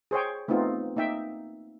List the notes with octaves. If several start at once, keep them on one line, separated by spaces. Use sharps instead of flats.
G#4 C5 C#5 G5
A3 B3 C4 D#4 F4
A#3 D#4 E5 G5